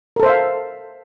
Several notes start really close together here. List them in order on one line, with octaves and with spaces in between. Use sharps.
A#4 A4 C5 E5 F5